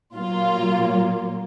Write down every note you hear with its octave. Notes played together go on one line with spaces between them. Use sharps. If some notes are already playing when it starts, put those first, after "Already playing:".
A#2 F#3 A#3 F4